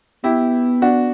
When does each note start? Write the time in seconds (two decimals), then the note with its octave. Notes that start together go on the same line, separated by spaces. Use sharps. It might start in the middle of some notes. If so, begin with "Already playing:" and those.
0.24 B3 E4 G4
0.82 D4 F#4